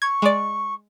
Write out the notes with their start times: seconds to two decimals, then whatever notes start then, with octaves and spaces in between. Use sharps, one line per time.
0.02 C#6 G#6
0.22 G#3 D5